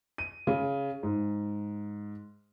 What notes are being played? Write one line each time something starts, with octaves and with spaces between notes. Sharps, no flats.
D#7
C#3
G#2